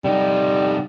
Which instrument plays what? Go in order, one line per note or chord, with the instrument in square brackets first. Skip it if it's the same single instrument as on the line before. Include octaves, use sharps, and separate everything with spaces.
[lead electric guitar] C3 D#4 [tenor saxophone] G3